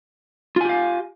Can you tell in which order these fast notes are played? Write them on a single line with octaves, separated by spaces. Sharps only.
F4 G#5 G4 F5